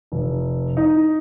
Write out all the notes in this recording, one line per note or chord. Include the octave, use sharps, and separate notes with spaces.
F1
D#4